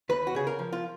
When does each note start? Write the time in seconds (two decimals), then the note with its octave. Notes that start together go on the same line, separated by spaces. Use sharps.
0.09 D#2 B4
0.27 F#4
0.35 C#3 G#4
0.47 A#4
0.59 F3
0.73 F4